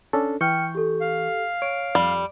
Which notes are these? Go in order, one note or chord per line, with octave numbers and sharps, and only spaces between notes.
C#4 D4 A4
E3 G5 C#6 F6 G6 C#7
G4 A4
F5
C#5 D7
F2 G3